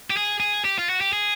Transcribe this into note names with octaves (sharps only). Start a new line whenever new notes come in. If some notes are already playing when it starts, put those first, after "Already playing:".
G4
G#4
G#4
G4
F4
F#4
G4
G#4